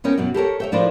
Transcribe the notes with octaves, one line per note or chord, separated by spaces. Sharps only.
E2 B3 C#4 A#4 G5
F#2 B2 F#3
G4 A4 A#4 C#5
C#5 E5 G5
A2 F3 D4 E4 A#4 C5